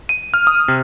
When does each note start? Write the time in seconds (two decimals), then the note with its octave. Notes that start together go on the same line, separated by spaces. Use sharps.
0.09 D#7
0.34 F6
0.47 D#6
0.68 C3